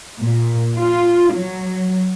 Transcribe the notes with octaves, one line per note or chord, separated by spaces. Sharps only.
A#2
F4
F#3